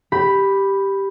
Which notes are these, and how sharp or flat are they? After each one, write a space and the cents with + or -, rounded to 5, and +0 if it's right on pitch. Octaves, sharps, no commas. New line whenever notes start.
G4 +0 B5 +0